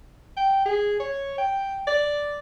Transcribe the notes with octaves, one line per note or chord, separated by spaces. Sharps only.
G5
G#4
C#5
G5
D5